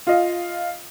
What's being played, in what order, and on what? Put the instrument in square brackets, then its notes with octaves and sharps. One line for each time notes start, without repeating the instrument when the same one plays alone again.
[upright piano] F4 D#5 F5